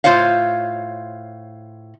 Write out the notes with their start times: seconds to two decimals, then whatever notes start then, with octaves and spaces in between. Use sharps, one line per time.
0.04 A2 B3 F4 C5 C#5 F5